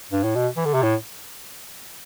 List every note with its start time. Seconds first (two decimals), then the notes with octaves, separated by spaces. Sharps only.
0.13 G2
0.24 A2
0.35 B2
0.57 E3
0.65 D3
0.74 C3
0.83 A2